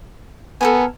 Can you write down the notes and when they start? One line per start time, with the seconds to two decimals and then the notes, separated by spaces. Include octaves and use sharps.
0.61 B3 A4 A#4 G#5